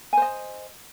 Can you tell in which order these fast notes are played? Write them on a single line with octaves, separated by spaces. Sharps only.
G#5 C5 D#5